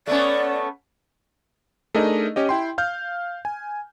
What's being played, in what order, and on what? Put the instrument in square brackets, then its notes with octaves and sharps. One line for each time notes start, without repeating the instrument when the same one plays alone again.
[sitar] A3 B3 C#4 [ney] D5
[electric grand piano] A3 D4 D#4 G#4 A#4 D#5
C#4 G4 D#5
E4 G5 C6
F5 F6 G6
G#5